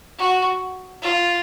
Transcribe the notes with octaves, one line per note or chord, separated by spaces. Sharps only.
F#4
F4